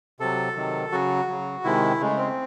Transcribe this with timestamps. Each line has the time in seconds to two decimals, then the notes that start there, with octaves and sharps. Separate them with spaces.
0.20 C3 F#3 A4
0.56 C3 D#3 F#3
0.92 C#3 F#3 F#4
1.28 C#3 F#3
1.64 C3 D#3 G#3 E4
2.00 C#3 G#3 A3
2.18 C4